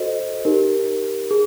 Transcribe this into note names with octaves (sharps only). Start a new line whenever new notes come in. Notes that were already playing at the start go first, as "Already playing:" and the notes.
Already playing: F#4 A4 C5 D#5
D#4 G4 A#4
G#4